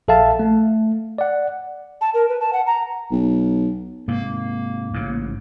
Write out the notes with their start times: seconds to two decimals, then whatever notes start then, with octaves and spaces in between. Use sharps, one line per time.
0.08 A#1 A4 E5 F5 A5
0.39 A3
1.18 D5 F#5
2.01 A5
2.14 A#4
2.29 B4
2.40 A5
2.53 F#5
2.67 A#5
3.12 B1
4.08 G#2 C3 D#3 A#3
4.94 A1 G#2 C#3